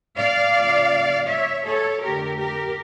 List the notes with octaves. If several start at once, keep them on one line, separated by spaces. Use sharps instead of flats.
D5 F5
C#3 F3 A#3
C#5 E5
A4 C#5
F2 D3 A3 G4 A#4
G4 A#4